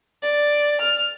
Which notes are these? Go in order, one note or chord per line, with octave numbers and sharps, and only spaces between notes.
D5
F6